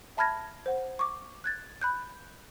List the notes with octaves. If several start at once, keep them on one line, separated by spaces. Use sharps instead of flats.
E5 A5 B5 F6 G#6 A#6
C5 F#5
C#6 D6
F#6 G#6 A6
B5 F#6 G6